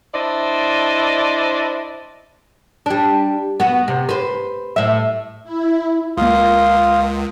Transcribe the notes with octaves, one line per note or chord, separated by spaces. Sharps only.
D4 E4 C5 D5 D#5
G3 D4
B3 F#4
C3
B4 C5
A2 E5
E4
C#2 A#3 F4 F5 C6 D#6